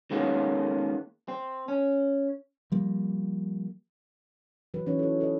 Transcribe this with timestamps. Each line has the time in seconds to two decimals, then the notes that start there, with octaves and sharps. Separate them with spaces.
0.11 D#3 G#3 A#3 B3 C#4
1.28 C4
1.68 C#4
2.72 F3 G3 A#3
4.74 E3 F#3 B4
4.86 E3 C#4 D#4 C#5
4.99 A4 C#5
5.20 A4 B4 D#5